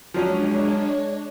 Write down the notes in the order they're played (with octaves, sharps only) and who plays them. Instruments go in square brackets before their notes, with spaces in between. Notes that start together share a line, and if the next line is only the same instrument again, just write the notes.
[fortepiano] F3 F#3 C#4 [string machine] G#3 D4 C#5